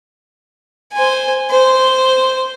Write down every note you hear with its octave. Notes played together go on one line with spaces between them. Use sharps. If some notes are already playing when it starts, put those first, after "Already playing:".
C5 G#5
C5